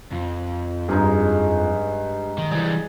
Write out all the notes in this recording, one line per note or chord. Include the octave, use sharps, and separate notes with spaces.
F2
G2 G#3 D#4 G#4
D#3
E3 G3 G#4